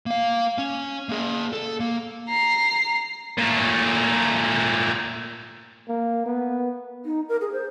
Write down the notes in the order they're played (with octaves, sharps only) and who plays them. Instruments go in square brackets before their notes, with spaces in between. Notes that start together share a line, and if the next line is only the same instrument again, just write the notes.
[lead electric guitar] A#3 F5
C#4
A#3 G#4
A4
A#3
[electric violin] A#5 C7
[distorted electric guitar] A#2 A3
[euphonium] A#3
B3
[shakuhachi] D#4
A#4
G#4
C5